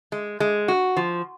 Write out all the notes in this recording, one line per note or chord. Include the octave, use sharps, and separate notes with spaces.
G#3
G#3
F#4
F3